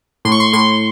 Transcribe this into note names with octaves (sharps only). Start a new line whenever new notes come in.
A2 C6
C#6
C6
A2 C6